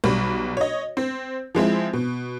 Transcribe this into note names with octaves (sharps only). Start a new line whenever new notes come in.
B1 G3 B5
C#5 D#5
C4
F3 G#3 C4 E4
B2